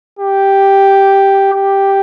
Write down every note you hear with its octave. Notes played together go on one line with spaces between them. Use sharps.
G4
G4